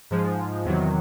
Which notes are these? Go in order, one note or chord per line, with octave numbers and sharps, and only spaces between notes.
G#2 F3 G#3
E2 C3 D#3 F#3